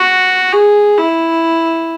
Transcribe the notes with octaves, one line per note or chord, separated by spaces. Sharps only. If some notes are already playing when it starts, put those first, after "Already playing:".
Already playing: F#4
G#4
E4